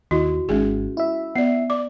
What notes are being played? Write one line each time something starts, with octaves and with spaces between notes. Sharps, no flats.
D#2 E4 F#4 D#5
G#1 G#2 G#3 C#4 G#4
E4 E5
B3 D5 C7
D5 D6